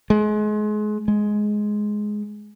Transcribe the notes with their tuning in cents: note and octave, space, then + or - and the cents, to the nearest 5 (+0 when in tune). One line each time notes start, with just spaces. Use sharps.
G#3 +30
G#3 +10